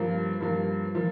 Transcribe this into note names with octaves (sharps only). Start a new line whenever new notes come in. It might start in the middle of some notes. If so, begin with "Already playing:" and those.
Already playing: G2 F3 A#3
G2 F3 A#3
F3 A#3